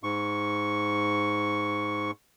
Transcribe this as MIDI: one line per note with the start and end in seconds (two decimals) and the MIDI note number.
0.03 2.11 44
0.03 2.11 85